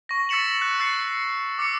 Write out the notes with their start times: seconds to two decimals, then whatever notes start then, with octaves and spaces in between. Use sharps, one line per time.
0.09 C#6 A#6
0.29 E6 A6 B6 C#7 E7 F#7
0.62 F#6
0.80 E6 F#6 A6 C7 C#7
1.58 D6 E6 C#7